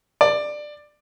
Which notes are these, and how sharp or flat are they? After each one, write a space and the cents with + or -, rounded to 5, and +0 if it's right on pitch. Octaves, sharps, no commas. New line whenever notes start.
D5 +15